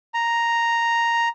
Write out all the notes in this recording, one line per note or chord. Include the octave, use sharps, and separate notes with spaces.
A#5